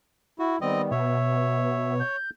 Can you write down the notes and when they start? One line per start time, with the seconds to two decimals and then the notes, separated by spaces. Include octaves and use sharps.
0.39 E4 F#4
0.61 D#3 G3 B3 C4 D#5
0.91 B2 C#5 E5
2.00 G6